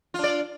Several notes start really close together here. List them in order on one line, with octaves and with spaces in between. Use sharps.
F4 D4 D5